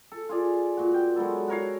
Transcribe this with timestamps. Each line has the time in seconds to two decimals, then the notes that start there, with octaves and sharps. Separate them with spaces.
0.12 A4
0.29 F4 G#4 D5
0.77 A#2 F#4
0.94 G5
1.16 F#3 G#3 B3 A4
1.48 F#4 A#4 C#5 F5